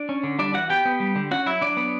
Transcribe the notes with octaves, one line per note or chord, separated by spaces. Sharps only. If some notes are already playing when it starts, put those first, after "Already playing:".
Already playing: D4 D5
C#4
D3
G3 D4 D5
E3 F#4 F#5
B3 G4 G5
B3
G3
D3
C#4 F#4 F#5
F#3 E4 E5
F#3 D4 D5
B3